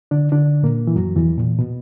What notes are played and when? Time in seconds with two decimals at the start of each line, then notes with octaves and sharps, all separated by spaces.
0.11 D3 D4
0.32 D3 D4
0.63 A#2 A#3
0.87 E3
0.95 F#2 F#3
1.16 E2 E3
1.38 A#2
1.59 B2